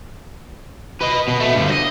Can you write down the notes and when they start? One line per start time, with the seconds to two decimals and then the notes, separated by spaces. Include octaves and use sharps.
1.01 B4 D#5
1.28 B2
1.40 A3 B3
1.55 G2 D3
1.68 C5 D#5